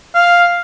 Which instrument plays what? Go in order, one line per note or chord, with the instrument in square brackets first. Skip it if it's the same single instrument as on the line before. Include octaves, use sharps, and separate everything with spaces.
[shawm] F5